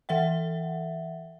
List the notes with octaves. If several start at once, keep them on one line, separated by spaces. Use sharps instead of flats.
E3 E5 F#5